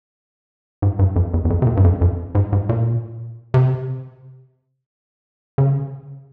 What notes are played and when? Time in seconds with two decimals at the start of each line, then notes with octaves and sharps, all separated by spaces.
0.82 G#2
0.99 G2
1.16 F2
1.34 E2
1.45 E2
1.50 F2
1.62 C3
1.67 A#2
1.77 G2
1.84 F2
2.01 F2
2.35 G#2
2.53 G#2
2.69 A#2
3.54 C3
5.58 C#3